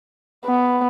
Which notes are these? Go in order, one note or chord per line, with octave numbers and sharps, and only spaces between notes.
B3